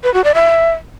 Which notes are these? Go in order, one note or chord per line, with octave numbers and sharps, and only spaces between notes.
B4
F#4
D5
E5